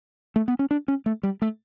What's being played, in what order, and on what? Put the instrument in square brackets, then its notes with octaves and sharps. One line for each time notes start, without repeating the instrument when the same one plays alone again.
[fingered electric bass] A3
B3
C#4
D4
C#4
A3
G3
A3